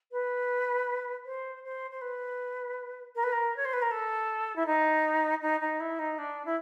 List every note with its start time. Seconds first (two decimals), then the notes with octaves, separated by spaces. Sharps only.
0.12 B4
1.25 C5
1.64 C5
1.91 C5
2.01 B4
3.15 A#4
3.23 B4
3.32 A#4
3.56 C#5
3.65 C5
3.73 B4
3.82 A#4
3.91 A4
4.56 E4
4.66 D#4
5.42 D#4
5.60 D#4
5.80 E4
5.99 D#4
6.18 D4
6.45 E4